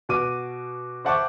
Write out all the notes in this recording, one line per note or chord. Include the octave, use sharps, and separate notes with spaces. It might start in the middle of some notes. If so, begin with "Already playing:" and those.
B2 F#4 D6 D#7
C5 E5 F#5 A5 C#6 D6